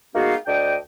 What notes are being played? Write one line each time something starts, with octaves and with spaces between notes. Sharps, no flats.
G#3 A#3 B3 D#4 F#4 F5
D2 D4 D#5 G5